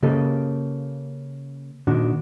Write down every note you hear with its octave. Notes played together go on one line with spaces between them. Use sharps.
C#3 A#3 G4 A4 D#5
A#2 D#3 D4 F#4